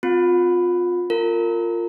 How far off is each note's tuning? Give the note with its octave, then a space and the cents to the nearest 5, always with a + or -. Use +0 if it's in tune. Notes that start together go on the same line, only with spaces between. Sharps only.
C4 -20 F4 +25
F4 +0 A#4 -25